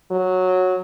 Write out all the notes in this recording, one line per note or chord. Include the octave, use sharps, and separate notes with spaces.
F#3